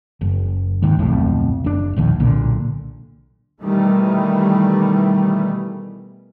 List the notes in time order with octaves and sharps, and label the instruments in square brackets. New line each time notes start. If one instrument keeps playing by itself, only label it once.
[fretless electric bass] F#1
D#2 G#2 D#3
D1 B1 F2 A2
F#1 D4
E1 A#1 D#2
B1 A#2 D3
[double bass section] B2 D#3 E3 G3 A3